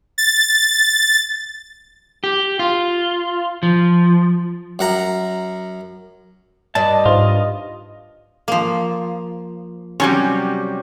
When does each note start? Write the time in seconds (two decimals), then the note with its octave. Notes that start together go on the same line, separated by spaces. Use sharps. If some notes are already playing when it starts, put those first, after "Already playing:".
0.18 A6
2.24 G4
2.59 F4
3.63 F3
4.79 F#2 F#5 A#5
6.75 G2 D5 D#5 A5
7.06 G#2 F4
8.48 F3 A#3
10.00 C3 F#3 G3 C#4